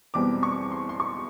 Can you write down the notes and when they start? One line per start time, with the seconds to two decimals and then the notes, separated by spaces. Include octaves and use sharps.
0.14 E2 B2 G3 C4 D6
0.43 C#6
0.72 C6
0.89 C6
1.00 C#6